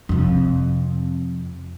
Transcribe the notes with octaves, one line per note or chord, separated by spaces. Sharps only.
F2 C3